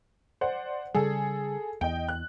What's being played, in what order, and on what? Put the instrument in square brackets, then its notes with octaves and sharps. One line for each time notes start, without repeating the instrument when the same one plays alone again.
[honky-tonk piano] C5 D5 F#5
[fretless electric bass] C#3 G3 [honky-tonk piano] G#4 A4
[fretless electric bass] E2 [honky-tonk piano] D#5 G5
[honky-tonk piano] F#6